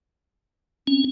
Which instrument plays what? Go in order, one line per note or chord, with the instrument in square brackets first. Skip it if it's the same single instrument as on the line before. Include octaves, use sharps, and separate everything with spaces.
[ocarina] C4 [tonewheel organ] C#4